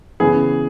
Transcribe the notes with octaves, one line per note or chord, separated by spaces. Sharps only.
C#3 E3 B3 G#4